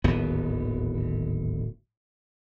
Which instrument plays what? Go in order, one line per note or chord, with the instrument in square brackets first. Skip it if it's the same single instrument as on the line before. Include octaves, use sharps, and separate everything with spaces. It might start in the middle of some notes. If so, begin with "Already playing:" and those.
[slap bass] D1 G#1 D#2 B3